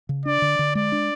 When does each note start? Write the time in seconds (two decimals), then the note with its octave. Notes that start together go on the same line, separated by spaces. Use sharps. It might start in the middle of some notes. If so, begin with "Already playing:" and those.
0.09 C#3
0.26 D4 D5
0.42 D3
0.59 D3
0.75 G#3 D5
0.92 D4